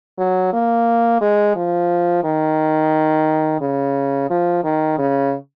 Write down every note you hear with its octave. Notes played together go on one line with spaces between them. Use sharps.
F#3
A#3
G#3
F3
D#3
C#3
F3
D#3
C#3